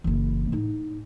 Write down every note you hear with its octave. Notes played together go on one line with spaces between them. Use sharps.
F#1 E3
A2 D#4